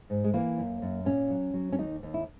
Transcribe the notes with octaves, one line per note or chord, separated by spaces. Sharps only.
G#2
G#3
E3 A#3
F#2
F#2
A#2 C#4
F#3
F#3
C#4
D#2 D#4
D#2
E4